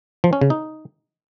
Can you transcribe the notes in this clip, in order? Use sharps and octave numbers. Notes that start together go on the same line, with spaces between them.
F3
C#4
C#3
D#4